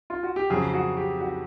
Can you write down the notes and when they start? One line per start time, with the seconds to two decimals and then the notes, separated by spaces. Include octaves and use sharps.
0.10 F4
0.23 F#4
0.36 G4
0.50 F2 C#3 F#3 G#4
0.73 F#4
0.97 G4
1.21 F#4